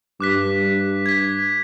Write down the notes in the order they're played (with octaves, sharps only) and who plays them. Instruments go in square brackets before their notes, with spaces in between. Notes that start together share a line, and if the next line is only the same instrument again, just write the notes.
[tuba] G2 [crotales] D6 F#6 B6
[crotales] G#6 B6